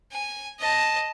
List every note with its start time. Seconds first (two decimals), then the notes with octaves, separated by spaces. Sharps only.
0.12 G#5
0.59 D#5 A5